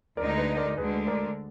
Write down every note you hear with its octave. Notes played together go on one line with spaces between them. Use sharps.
D2 D3 G#3 D#4 A#4 D5
B4 D#5
A#4 D5
D2 D3 G#3 G#4 B4
A#4 D5